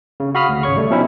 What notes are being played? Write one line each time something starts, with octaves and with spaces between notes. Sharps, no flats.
C#3
F#4 F5 B5 D#6 F6
D2
G#1 C#3 C#5 C#6
G3 A3
B2 F3 C4 C#4 D#4 E4